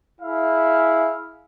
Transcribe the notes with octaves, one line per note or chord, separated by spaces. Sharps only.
E4 G#4 E5 F5